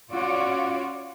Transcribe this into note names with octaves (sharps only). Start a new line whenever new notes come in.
C#4 F4 F#4 C#5 D5